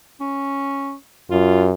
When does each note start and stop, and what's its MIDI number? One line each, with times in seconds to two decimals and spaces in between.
0.20 0.94 61
1.31 1.73 42
1.31 1.68 65